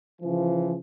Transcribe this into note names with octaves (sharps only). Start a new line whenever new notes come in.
C#3 E3 F3